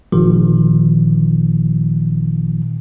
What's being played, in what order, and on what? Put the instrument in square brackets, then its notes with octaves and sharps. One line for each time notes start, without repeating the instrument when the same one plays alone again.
[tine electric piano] G1 A#2 D#3 F3